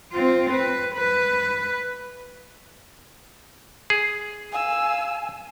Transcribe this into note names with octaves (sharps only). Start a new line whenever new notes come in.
C4 F4
B4
B4
G#4
F5 G#5 E6